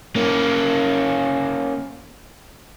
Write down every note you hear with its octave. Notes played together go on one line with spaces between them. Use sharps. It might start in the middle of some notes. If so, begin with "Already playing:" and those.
A#3 C#4